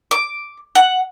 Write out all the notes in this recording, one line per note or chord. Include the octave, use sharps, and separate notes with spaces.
D6
F#5